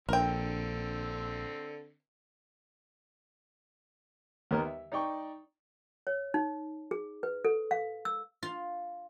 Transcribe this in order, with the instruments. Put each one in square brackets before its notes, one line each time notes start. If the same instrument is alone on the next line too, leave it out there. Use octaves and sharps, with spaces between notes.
[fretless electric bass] A#1 [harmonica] D3 C4 [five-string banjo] A#4 G5
[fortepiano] D#2 B3 D#4 A#4 D#5
E5
D#4 D5 G5 C#6
[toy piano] C#5
D#4
G#4
B4
A4
F5
E6
[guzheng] F4